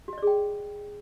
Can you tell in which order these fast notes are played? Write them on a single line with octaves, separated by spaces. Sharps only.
F#4 D#5 D5 G#4 G5